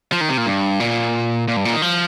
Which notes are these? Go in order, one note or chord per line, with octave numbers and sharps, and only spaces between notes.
F3
D#3
C3
A#2
G2
A#2
A#2
G2
A#2
D#3
F3